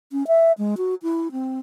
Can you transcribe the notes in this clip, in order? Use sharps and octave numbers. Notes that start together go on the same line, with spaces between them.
C#4
E5
G#3
F#4
E4
C4